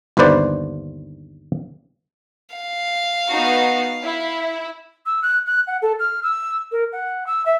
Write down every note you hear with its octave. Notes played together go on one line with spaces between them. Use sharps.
G1 D#2 D3 B4 C5 D5
F5
B3 D#4 F#4
E4
E6
F#6
F#6
F#5
A4
F6
E6
A#4
F#5
E6
E5